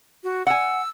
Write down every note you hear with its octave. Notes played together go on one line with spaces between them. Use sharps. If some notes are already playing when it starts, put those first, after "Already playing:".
F#4
F#5 G#5 E6